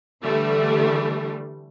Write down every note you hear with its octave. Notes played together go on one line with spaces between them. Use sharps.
D3 E3 G3 A3